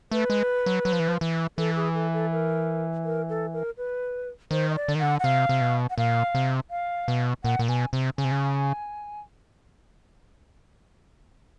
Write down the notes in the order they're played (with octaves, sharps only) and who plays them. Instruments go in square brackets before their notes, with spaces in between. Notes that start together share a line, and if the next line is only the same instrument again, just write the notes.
[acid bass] A3 [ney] B4
[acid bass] G#3
F#3
F#3
F3
E3
F3
E3
[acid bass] E3 [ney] A4
[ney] G#4
A4
A4
A#4
A#4
A4
A#4
B4
[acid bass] D#3 [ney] C5
[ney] D#5
D5
[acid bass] D3
D#3
[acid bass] D3 [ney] F#5
[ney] F#5
[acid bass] C3 [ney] F5
[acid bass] C3
B2
[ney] F#5
[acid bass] A#2 [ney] F5
[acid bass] C3
[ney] F5
[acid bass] B2
[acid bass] A#2 [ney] F#5
[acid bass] A#2
[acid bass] B2 [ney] G#5
[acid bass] C3
[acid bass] C#3 [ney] G#5
[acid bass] C3
C#3